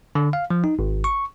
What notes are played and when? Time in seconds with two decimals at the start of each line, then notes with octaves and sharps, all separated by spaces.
0.15 D3
0.33 F5
0.50 F3
0.64 D#4
0.79 G#1
1.04 C#6